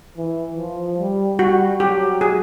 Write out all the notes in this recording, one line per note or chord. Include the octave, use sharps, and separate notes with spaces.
E3
F3
G3
G3 F#4
F#3 G4
G#4